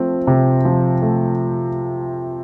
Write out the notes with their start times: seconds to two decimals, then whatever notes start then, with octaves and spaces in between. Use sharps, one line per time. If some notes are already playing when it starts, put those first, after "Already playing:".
Already playing: F3 A3 C4
0.27 C3
0.65 F3
1.02 A3